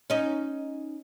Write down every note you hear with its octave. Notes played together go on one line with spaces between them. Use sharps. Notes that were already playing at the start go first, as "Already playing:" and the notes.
C#4 D#4